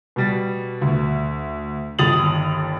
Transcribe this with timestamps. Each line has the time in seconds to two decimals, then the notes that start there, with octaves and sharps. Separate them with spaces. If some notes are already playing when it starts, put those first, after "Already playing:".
0.16 B2 G3 A6
0.81 D2
1.99 G1 D#2 D#6 A6 F7 F#7